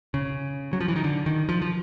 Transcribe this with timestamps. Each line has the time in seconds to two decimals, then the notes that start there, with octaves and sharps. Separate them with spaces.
0.14 C#3
0.73 F#3
0.80 F3
0.88 E3
0.96 D#3
1.04 D3
1.26 D#3
1.49 F3
1.61 F3